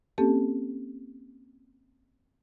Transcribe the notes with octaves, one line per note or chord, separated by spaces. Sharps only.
A#3 C4 C#4 G4 A4 A5